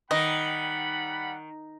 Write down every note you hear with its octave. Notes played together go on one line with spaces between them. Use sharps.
D#3 G3 D#5 F#5 B5